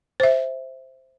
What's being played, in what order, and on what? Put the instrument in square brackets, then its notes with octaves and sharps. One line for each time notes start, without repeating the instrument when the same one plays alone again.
[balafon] C5 E5